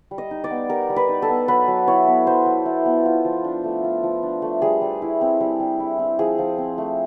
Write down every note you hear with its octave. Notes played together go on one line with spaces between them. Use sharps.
G3
D#5
D#4
D5
B3
G3 A#4
G3
B4
D#4
A4
B3
F#3 B4
F#3
E4 C#5
B3
F#3 C5
F#3
E4
B3
F4
F3
D4
A3
F4
F3
D4
A3
G3 G#4
G3
E4
C4
G3
G3
E4
C4
F3 G#4
F3
C4
A3